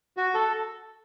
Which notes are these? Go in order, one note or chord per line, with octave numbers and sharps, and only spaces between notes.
F#4
A4